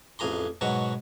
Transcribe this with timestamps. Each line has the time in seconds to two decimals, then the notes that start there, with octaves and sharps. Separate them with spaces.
0.19 A1 F2 G#4 A#5 C6
0.61 G#2 B2 F#3 F#4